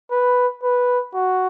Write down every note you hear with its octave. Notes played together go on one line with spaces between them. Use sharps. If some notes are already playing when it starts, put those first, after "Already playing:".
B4
B4
F#4